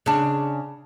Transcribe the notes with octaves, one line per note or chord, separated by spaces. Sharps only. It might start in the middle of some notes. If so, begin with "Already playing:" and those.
C#3 D4